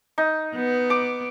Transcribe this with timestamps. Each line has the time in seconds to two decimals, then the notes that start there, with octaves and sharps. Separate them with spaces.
0.18 D#4
0.55 B3
0.90 D6